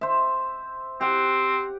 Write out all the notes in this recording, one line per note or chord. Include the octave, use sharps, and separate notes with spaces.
C5 E5
C4 G4 F#5